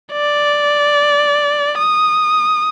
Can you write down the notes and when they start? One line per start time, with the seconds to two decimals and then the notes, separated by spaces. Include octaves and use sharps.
0.13 D5
1.78 D#6